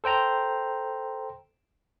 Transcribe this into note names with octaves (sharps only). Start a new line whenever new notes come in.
A4 C5 G5 A#5